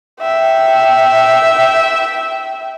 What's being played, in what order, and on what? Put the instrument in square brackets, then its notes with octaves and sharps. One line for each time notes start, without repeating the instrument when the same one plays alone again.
[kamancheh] E5 G5